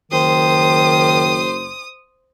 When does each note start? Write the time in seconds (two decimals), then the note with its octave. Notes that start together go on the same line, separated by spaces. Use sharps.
0.12 F#1 D#3 C5 D#6